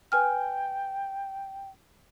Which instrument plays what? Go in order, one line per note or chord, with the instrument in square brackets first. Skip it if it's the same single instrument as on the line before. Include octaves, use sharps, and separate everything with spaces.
[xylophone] B4 G#5 F6 [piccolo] G5